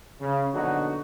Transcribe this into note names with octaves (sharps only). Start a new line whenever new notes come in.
C#3
A#1 B2 D3 F#3 D#4 F#4